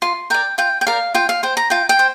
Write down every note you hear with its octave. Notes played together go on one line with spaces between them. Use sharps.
F4 C6
A#4 D5 G5
F4 G5
G5
A#4 D5 F5
F4 G5
F5
C5 G5
A#5
F4 G5
G5
C5